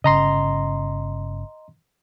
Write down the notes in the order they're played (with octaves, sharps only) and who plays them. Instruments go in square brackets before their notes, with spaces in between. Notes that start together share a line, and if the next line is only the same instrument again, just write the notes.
[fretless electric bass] G1 C#3 [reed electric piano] D#5 A#5 C6